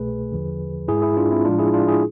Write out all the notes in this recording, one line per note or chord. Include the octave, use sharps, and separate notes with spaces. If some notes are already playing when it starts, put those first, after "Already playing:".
Already playing: C2 B2 A3 G#4 B4
E2 D3 F3
G#2 G#3 E4 G#4
E4 G#4
D4 F4
C4 E4
A2 F3 G#3 D4 F4
E4 G#4
D4 F4
E4 G#4